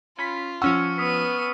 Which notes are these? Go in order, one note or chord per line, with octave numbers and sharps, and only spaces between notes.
C#4 F4 B5 B6
F3 C#4 F#5 C#6 E6 F6 C#7
B3 D#6 B6 D#7